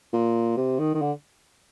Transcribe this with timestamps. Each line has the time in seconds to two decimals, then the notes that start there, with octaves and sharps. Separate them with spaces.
0.13 A#2
0.57 C3
0.79 D#3
0.95 D#3
1.02 D3